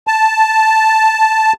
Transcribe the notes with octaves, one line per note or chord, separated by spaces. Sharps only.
A5